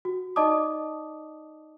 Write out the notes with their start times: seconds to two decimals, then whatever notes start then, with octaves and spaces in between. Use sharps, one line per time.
0.05 F#4
0.36 D#4 D5 D#5 A5 D6 D#6